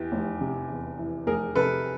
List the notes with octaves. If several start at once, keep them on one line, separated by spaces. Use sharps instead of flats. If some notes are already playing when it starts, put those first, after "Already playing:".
Already playing: E2 E3 G4
F1
C3
E2
E3
F1 G#4 A#4
C3 A4 B4